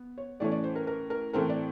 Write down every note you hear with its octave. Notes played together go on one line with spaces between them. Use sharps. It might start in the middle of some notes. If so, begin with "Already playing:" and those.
Already playing: B3
C#5
A2 E3 A3 C#4 D5
D5
C5
A#4
A#4
A#4
A2 E3 A3 C4 A#4
D5